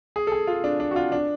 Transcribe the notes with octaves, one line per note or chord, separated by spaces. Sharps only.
G#4
A4
G#4
F4
D4
D4
F#4
F4
D4